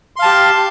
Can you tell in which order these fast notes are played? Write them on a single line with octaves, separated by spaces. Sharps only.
C6 F5 A5 G4